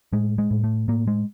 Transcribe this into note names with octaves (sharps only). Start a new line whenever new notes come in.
A2 G#3
G#3
A2
A3
A2 A#3
G#3